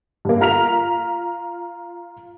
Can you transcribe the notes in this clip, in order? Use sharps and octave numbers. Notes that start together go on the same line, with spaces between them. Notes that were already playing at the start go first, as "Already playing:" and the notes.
G2 A#3
F4 A#5 F6 B6 F7